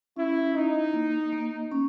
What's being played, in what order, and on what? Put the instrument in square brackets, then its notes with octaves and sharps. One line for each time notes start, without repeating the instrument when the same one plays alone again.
[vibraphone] C#4 [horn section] E4
[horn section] D#4 [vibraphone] E4
[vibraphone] A#3
A#3
C#4